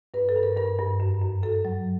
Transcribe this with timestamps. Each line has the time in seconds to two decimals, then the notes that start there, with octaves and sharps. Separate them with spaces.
0.14 G2 B4
0.29 A4
0.36 G2
0.43 A#4
0.57 G2 A#4
0.79 G2
1.00 F#2
1.22 F#2
1.43 F#2 A4
1.65 F#3